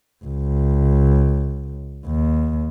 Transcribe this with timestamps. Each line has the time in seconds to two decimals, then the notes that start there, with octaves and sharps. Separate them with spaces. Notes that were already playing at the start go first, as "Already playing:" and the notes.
0.24 C#2
2.06 D#2